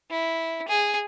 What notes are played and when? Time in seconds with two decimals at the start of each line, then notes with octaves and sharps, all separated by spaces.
0.11 E4
0.68 G#4